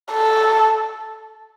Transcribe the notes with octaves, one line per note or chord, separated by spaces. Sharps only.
A4